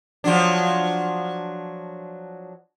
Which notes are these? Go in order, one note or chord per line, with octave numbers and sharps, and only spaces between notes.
F3 F#3 D4